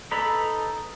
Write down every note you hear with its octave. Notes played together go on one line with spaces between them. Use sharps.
D#4 A4 B4 A#5 B5